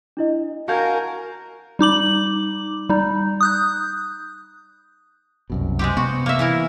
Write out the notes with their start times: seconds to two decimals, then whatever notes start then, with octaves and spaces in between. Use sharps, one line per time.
0.17 D4 E4 D#5
0.68 F#4 A#4 F5 G#5 A5 G6 G#6
1.79 G3 D#4 D6 F#7
2.89 G3 D#4
3.41 D#6 F#6 G6
5.50 C2 F#2 B2
5.79 G#3 C4 G4
5.97 C3 B3 F#4
6.26 A#3 E5
6.39 E3 E4 A#4